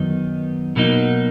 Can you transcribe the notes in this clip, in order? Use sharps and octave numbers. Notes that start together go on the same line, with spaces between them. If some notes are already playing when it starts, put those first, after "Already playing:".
Already playing: F#2 D#3 F#3 B3 D#4
B2 F#3 A#3 D#4